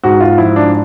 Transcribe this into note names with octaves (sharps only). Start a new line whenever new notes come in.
G#2 F#4
F4
F3 E4
D4